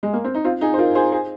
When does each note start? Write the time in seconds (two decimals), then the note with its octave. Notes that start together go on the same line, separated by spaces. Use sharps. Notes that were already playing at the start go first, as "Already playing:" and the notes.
0.03 G#3
0.13 A#3
0.24 C4
0.34 D#4
0.44 C4 F4
0.61 D#4 G#4
0.74 C5
0.78 F4 A#4
0.95 G#4 C5
1.12 G#4 C5